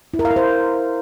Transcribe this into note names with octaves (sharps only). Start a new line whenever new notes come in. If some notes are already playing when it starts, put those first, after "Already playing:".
E4
A#4
F5
A#4
C5